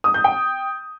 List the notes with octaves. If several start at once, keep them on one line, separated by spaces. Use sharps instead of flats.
D#6
G6
G5